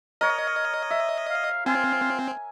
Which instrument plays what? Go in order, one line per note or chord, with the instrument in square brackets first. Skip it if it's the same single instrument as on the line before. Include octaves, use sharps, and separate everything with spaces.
[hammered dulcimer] A#4 C#5 [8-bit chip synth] D#5
[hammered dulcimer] E5
[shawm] F5
[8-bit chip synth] C4 [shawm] F4 [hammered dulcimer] G#5